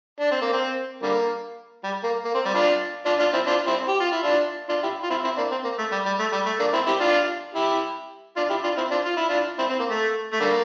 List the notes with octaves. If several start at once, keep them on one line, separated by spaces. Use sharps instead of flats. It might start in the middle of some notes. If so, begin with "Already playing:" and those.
D4
C4
A#3
C4
D3 G3 A#3
G3
A#3
A#3
C4
G3
D4 F4
D4 F4
D4 F4
C4 E4
D4 F4
C4 E4
G4
F4
E4
D4 F4
D4 F4
E4 G4
F4
C4 E4
C4 E4
A#3 D4
C4
A#3
A3
G3
G3
A3
G3
A3
A#3 D4
C4 E4
E4 G4
D4 F4
E4 G4
D4 F4
E4 G4
D4 F4
C4 E4
D4 F4
F4
E4
D4 F4
C4 E4
C4
A#3
A3
A3
D3 G3 A#3